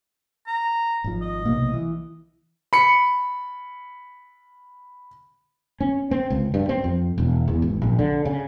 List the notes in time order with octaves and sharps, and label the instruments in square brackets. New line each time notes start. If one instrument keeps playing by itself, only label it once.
[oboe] A#5
[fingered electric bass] G#1 F3
[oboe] D#5
[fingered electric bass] B1 C3 A#3
E3
[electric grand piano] B5 C#7
[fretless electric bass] C#4
C4
C#2
G2
C4
F2
E1
E2
G#1
A#1
D3
C#3